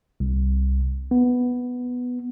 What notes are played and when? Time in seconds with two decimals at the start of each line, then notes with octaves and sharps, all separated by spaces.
0.20 C2
1.11 B3